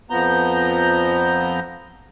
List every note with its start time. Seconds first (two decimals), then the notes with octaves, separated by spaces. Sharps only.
0.10 F2 F3 B3 A#5 G6